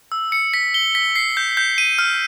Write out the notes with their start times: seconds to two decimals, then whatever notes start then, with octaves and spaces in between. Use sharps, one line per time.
0.12 E6
0.32 C#7
0.54 B6
0.74 G7
0.95 B6
1.16 C7
1.37 G6
1.57 G6
1.78 D#7
1.99 F6